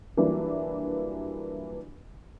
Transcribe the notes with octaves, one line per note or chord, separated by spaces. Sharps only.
E3 F#3 G3 A#3 D4 F4